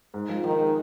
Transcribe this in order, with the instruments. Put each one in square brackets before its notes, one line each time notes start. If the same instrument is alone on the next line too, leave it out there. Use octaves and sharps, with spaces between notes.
[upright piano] G#2
F3
[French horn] D#3 [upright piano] D#4
[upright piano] G#3